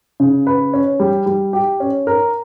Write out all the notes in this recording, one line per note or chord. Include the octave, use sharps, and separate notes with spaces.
C#3
B4
C#4
G3
G3
G4
C#4
A#4